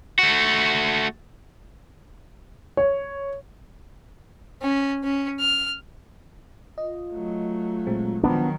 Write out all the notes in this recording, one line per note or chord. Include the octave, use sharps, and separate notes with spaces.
A3 F#4
C#5
C#4
C#4
F6
F4 D#5
F#3 A3
A#2 G#3 C4
D#3 F3 F#3 B3 D4